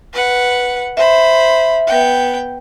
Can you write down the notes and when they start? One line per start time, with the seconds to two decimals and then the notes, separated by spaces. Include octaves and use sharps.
0.13 B4 F#5
0.97 C5 E5 B5
1.87 B3 G5